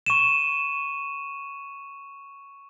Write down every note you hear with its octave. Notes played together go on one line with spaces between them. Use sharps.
C#6 D#7 E7